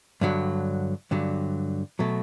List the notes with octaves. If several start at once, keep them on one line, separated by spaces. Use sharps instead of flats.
G2 D3 F#3
G2 D3 F#3
B2 F#3 A3